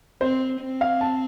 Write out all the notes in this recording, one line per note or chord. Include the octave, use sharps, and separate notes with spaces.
C4 C5
C4
F5
A5